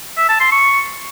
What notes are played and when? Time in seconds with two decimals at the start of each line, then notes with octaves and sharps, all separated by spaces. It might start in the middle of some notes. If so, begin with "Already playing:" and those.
0.17 E5
0.29 A5
0.40 C6
0.52 C#6